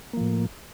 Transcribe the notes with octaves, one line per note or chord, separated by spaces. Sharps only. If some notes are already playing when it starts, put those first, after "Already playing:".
A2 F3 A#3